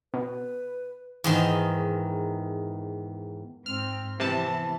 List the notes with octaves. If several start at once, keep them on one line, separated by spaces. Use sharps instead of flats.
B2 B4
E2 G#2 D#3
G#2 C4 F6
C3 E3 B3 A5